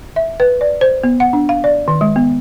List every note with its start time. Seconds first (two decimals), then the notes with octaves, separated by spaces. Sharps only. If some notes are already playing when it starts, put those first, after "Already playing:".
0.16 E5
0.40 B4
0.61 D5
0.81 C5
1.03 B3
1.20 F#5
1.33 D4
1.49 F5
1.64 D5
1.88 D#3
2.01 G#3
2.16 B3